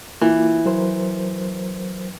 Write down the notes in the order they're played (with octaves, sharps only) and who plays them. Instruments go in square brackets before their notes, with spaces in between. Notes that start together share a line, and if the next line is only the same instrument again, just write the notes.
[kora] E3 [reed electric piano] A#3 F4
[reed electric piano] F#3 A#4 C5